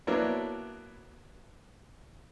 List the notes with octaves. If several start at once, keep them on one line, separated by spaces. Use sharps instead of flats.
F#3 A#3 B3 D4 E4 C#5